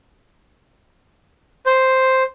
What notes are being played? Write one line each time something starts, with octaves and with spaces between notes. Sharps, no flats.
C5